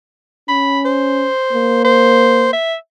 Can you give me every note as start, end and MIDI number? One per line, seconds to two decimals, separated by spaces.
0.49 1.28 61
0.49 0.80 83
0.85 1.84 72
1.53 2.52 58
1.84 2.51 72
2.53 2.75 76